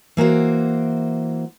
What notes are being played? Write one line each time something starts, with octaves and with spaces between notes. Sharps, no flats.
E3 A#3 F#4 C5